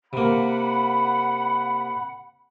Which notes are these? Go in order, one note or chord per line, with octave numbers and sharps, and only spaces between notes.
C3 A#3 F#5 B5